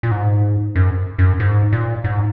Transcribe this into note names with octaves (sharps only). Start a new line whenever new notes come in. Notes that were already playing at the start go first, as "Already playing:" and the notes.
A#2
G#2
F#2
F#2
G#2
A#2
G#2